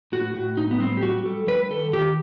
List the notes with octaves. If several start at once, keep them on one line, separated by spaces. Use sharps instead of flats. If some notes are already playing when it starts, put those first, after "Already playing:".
A2 F#4
A2 F#4
A2 D#4
B3
G3 C4
G4
G3 F#4
G3 A4
G3 B4
D#3 A4
D#3 G4